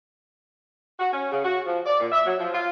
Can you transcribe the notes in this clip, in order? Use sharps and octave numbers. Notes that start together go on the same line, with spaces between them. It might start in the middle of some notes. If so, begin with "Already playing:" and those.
F#4
C#4
C#3
F#4
F3
D5
A#2
E5
F#3
F3
F4